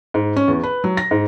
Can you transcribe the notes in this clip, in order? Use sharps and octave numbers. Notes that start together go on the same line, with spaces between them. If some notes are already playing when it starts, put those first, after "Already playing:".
G#2
C#4
E2
B4
F#3
A#6
G#2